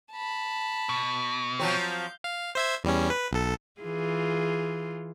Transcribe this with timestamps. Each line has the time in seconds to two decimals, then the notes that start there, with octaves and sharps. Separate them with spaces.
0.12 A5 B5
0.89 B2
1.60 F3 F#3 C4 F5 G6
2.24 F5
2.55 C5 E5 G#6
2.84 E2 G3 C#4
3.10 B4
3.31 B1 A4
3.81 E3 F4 G#4